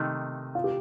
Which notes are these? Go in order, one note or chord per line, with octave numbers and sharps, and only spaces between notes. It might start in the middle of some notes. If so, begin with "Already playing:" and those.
Already playing: C3 D#3 A3 D#4
F4
G4